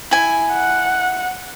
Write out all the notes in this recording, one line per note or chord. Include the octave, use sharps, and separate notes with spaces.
E4 G#5
F#5